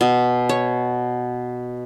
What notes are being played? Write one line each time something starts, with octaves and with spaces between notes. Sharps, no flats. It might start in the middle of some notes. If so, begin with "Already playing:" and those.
B2
C#5